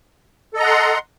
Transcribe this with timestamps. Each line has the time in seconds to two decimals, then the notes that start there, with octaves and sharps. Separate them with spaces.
0.54 A4
0.57 D#5
0.60 A#5
0.63 F#5
0.66 C6